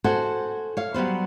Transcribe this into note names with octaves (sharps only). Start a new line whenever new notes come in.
F#4 A4 C5 F#5 G#5
C#5 F5
F#3 G3 B3 C5